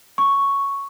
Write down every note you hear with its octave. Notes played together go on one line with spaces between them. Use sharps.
C#6